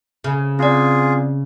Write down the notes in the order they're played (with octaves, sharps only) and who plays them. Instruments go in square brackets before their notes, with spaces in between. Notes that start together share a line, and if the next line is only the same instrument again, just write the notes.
[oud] C#3
[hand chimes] C4 D5 [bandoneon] F4 G#4